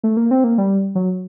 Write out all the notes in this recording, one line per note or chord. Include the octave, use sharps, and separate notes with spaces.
A3
A#3
C4
A#3
G3
F#3